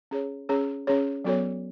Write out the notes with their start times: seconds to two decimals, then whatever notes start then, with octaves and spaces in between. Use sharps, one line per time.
0.11 C#4 G#4 C#5
0.49 C#4 G#4 C#5
0.87 C#4 G#4 C#5
1.24 F#3 B3 F#4 A4 C#5